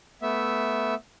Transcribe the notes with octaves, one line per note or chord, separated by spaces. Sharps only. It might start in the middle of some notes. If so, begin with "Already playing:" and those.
A3 B3 E5